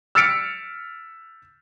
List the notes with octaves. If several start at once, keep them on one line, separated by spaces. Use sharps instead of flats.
E6 F6 A6 B6 C#7 D7